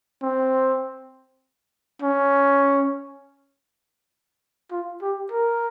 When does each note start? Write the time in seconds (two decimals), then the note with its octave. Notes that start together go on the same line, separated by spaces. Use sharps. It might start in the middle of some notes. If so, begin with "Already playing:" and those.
0.23 C4
2.02 C#4
4.71 F4
5.02 G4
5.32 A#4